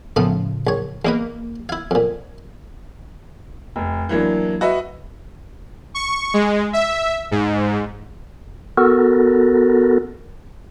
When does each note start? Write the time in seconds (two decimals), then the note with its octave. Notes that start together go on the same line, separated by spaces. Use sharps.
0.16 A2 C#3 F3 A3 B3 F5
0.67 A#1 C#5
1.05 E2 A#3 D#4 B4
1.69 E4 F5 G#6
1.91 F2 A#2
3.76 F1
4.09 E3 F#3 A#3 D4
4.61 F#4 B4 D#5 E5
5.94 C#6
6.34 G#3
6.73 E5
7.31 G#2
8.77 B3 F#4 A4 A#4